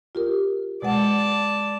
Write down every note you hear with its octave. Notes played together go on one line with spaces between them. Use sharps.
F4 G4 A#4
B2 G#3 D5 F#5 A5